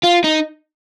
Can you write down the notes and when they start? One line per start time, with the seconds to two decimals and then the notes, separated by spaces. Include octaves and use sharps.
0.03 F4
0.24 D#4